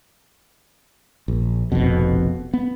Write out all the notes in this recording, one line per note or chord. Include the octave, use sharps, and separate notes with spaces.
A#1
F1 A#1 F2 B2
B3